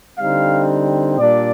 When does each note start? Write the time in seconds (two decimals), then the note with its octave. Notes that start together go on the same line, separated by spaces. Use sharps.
0.18 D3 G3 C4 D#4 F5
1.18 A#2 G3 D4 D5